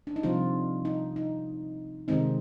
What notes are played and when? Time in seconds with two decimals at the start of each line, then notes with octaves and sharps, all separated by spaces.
0.07 D4
0.16 D#4
0.23 C3 F3 G3 C4 F4
0.85 D#4
1.16 D#4
2.08 C3 D#3 G#3 C4 D#4